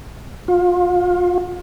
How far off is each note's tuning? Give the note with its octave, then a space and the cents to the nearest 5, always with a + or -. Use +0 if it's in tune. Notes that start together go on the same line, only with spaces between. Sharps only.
F4 +30